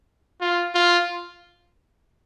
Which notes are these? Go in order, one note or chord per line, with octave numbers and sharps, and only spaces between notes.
F4
F4